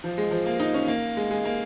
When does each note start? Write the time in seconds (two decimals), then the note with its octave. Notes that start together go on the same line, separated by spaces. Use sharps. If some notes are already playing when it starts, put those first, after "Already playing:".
0.04 F3
0.18 G#3
0.31 F3
0.46 A#3
0.60 D#4
0.74 C#4
0.88 A#3
1.17 G#3
1.31 G#3
1.45 A#3